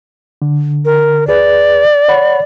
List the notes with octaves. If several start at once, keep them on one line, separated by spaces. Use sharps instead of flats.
D3
A#4
D2 G#4 B4 D5
C#5 F#5 B5